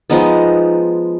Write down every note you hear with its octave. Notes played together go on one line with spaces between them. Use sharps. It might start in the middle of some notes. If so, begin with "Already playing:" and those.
F3 G#3 B3 D#4